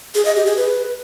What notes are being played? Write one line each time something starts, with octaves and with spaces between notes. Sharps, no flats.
G#4
D#5
G4
G#4
B4